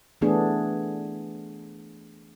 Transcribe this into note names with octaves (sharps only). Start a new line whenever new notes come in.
E3 A3 B3 D4 G#4